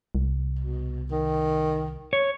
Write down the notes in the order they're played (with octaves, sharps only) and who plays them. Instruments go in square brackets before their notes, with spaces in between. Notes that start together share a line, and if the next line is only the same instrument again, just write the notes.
[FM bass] C2
[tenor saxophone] B2
D#3
[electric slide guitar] C#5